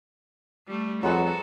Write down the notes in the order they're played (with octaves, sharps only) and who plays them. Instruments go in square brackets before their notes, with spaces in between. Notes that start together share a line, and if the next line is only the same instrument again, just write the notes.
[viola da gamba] G3 A3
[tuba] F2 [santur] F#3 G#3 B4 [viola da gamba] F#4 A4